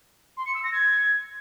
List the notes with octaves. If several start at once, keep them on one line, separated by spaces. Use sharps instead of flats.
C6
C#7
E6
A#6
G#6